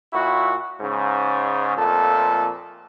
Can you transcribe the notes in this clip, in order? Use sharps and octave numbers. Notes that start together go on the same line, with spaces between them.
A#2 E4 F#4
G#2 C#3
F2 A#2 A3 A4